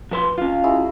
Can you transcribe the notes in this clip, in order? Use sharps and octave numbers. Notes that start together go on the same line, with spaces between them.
F3 B4 C6
C#4 F4 F5
G#3 E4 F#4